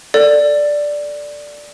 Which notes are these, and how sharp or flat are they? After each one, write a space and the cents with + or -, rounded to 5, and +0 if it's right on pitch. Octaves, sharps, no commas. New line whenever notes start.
A4 +15 D5 +0